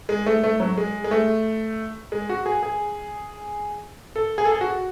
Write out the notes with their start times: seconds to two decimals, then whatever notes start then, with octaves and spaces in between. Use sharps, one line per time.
0.09 G#3
0.26 A3
0.44 A3
0.60 F#3
0.78 G#3
1.04 G#3
1.11 A3
2.12 G#3
2.29 F#4
2.46 G#4
2.63 G#4
4.16 A4
4.38 G#4
4.45 A4
4.52 G#4
4.61 F#4